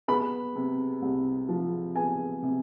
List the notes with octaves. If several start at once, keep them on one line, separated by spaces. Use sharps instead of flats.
B3 B5
C3
C2
F3
B3 G#5
C3